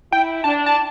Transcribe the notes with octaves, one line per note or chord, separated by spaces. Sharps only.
E4 G5
D4 A5
A5